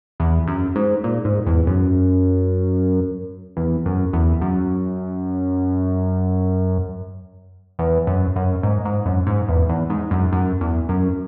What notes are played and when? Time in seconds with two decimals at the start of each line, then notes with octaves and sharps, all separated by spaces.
0.20 E2
0.48 F#2
0.76 G#2
1.04 A#2
1.25 G#2
1.46 E2
1.67 F#2
3.57 E2
3.85 F#2
4.13 E2
4.41 F#2
7.79 E2
8.07 F#2
8.36 F#2
8.63 G#2
8.85 G#2
9.06 F#2
9.27 G#2
9.48 E2
9.69 E2
9.90 G#2
10.11 F#2
10.33 F#2
10.61 E2
10.89 F#2